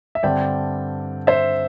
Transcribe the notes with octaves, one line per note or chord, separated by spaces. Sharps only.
E5
G2 D3 C4 D5 G5
C5 E5